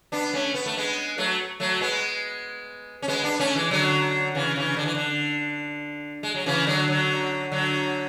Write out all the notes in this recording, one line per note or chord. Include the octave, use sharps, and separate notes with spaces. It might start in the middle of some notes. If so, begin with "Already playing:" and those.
B3 D4
A3 C#4
B3
A3
G#3 B3
F#3 A3
F#3 A3
G#3 B3
C#4
G#3 B3
B3 D4
A3 C#4
E3 G#3
D3 F#3
C#3 E3
C#3 E3
D3
E3
D3
G#3
F#3
C#3 E3
D3 F#3
D3 F#3
D3 F#3